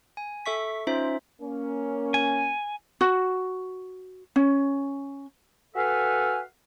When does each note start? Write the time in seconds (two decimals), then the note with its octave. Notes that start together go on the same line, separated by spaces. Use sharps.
0.17 G#5
0.46 A4 E5 C#6 B6
0.87 C#4 D#4 F4 C5 E5
1.42 A#3 C#4
2.14 G#5
3.01 F#4
4.36 C#4
5.75 F#4 A4 B4 E5 F5 G#5